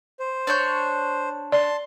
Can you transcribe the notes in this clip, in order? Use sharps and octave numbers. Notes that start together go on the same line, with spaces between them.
C5
D4 C#5 G6
D5 A5 C6